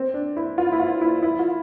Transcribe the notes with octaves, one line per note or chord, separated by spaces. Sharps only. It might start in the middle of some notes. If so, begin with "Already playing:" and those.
Already playing: C4
D4
E4
F4
E4
F4
E4
E4
F4